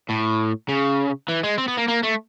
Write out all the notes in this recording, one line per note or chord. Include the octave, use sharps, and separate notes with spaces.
A2
C#3
E3
G#3
C4
B3
A#3
A#3
A3